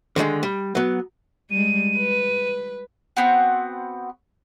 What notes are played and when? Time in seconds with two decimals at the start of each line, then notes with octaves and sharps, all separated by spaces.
0.16 D3 D#3 F#3 G#3
0.43 G3
0.75 F#3 B3
1.51 G3 G#3 D#7
1.96 B4
3.17 B3 C4 F#4